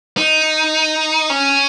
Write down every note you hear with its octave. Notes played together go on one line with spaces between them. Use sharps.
D#4
C#4